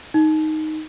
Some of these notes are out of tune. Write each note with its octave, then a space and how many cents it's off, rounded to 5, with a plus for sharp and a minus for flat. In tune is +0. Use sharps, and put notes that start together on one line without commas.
D#4 +5